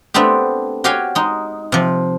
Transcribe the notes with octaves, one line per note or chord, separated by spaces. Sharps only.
A3 B3 C4 D4 G4
F#4 G4 C#5 F5 G5 G#5
G#3 D#4
C3 F3